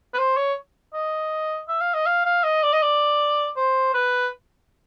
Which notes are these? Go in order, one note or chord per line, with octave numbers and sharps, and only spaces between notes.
B4
C5
C#5
D#5
E5
F5
D#5
F5
F5
D#5
D5
D#5
D5
C5
B4